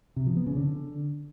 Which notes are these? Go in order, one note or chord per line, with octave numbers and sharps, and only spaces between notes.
C3
F3
B3
C#3
D3